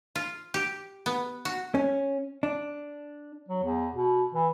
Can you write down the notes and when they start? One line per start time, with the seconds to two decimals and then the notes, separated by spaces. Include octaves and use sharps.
0.15 F4
0.54 G4
1.06 B3
1.45 F#4
1.75 C#4
2.43 D4
3.48 F#3
3.63 E2
3.95 B2
4.34 E3